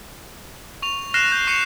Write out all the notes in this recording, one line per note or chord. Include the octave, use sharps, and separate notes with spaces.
C#6 F7
F6 F#6 A#6 C7 E7
G6
C#6 C7 C#7 F7